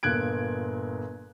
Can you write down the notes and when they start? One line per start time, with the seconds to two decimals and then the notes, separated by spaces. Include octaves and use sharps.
0.03 G1 A#2 F#6 G#6 D7